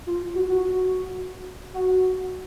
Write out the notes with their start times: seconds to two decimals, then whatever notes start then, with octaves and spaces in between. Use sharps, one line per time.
0.07 F4
0.35 F#4
0.48 F#4
1.74 F#4